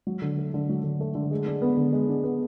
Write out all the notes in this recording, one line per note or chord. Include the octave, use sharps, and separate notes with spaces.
F#3
D3
A3
D3
F#3
D3
A3
D3
G#3
D4
B3
D3
G#3
D4
B3